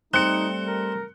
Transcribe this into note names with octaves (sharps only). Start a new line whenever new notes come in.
G3 A3 C4 D#4 F#6 C#7
A#4